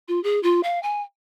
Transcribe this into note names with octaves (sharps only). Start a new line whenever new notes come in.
F4
G#4
F4
F5
G#5